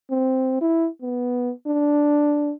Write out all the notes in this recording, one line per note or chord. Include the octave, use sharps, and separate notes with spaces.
C4
E4
B3
D4